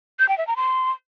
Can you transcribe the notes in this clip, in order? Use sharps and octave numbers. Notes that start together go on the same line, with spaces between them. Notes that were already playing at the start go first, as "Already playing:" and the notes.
G6
G5
E5
A#5
C6